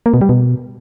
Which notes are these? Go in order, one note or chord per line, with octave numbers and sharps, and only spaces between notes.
A#3
B2
G3
B2